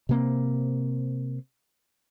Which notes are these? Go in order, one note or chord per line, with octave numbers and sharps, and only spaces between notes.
C3 A#3 C4